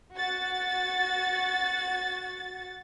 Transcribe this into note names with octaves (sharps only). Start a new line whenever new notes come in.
F#4 A6